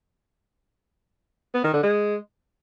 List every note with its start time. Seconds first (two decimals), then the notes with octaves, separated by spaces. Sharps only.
1.54 B3
1.64 D#3
1.74 D3
1.83 G#3